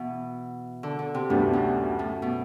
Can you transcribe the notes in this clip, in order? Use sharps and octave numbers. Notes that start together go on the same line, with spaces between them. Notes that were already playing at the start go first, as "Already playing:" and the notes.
Already playing: B2 E3
D3
D3
C3
D2 A2 D3 G3 B3
F#2
A2
B2